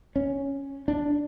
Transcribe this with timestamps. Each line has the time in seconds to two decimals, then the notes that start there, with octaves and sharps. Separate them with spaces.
0.16 C#4
0.88 D4